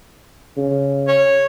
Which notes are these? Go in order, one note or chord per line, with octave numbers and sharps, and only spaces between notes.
C#3
C#5